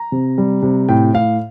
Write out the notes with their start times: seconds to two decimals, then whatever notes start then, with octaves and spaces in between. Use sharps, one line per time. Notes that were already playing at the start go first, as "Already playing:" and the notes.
Already playing: A#5
0.12 C3
0.38 G3
0.62 C3
0.89 A2 G5
1.14 A2 F5